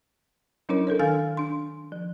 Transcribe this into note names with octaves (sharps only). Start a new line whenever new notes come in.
F#3 C#4 D4 E4 A#4 C#5
D4 A4 A#4 C#5
D#3 D4 F5 G#5 F6 A6
D4 C6
F3